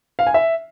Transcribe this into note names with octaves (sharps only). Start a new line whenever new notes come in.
F5
G#5
E5